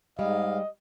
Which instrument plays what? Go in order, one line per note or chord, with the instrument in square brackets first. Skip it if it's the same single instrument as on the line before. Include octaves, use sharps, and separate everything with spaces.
[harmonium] G#2 F5 [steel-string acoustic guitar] G3 G#3 [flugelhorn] D#5